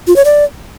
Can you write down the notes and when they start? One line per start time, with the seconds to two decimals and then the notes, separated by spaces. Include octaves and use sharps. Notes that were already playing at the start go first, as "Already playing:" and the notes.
0.07 F4
0.16 C#5
0.25 D5